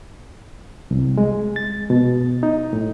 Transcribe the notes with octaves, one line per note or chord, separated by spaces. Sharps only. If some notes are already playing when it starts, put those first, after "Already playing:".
C2
G#3
A6
B2
D#4
A2